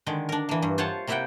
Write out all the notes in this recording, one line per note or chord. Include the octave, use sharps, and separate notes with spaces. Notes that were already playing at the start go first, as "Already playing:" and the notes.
D3 D#3 G#3
D4 A#4
E3 A#3
G2
F4 C5 C#5 F#5 A5
C3 A#3 E4 E5 F#5 G5